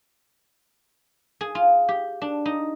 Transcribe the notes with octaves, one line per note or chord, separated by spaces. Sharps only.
G#4
F4
G4
D4
D#4